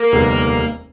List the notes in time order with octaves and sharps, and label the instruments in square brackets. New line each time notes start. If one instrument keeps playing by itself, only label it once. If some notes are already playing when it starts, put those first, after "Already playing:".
Already playing: [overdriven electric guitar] A#3
[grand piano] F1 D#2 D3 G3 B3